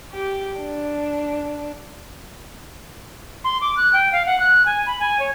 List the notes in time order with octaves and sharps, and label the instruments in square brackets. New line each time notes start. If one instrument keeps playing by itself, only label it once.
[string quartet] G4
D4
[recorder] C6
D6
F#6
G5
F5
F#5
F#6
G#5
B5
G#5
C#5